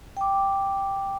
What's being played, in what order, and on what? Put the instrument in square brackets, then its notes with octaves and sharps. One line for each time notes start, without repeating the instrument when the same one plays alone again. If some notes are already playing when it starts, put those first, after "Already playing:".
[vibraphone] G5 D6